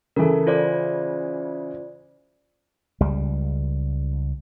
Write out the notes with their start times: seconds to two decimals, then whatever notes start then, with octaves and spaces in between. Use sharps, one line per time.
0.16 C#3 E3 A4 A#4
0.47 F4 C5 D5
3.01 C#2 G3